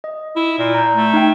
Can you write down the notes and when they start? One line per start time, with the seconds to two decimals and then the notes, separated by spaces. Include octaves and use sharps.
0.04 D#5
0.36 E4
0.59 A#2
0.75 A#5 G6
0.94 A3
1.14 D#4 G5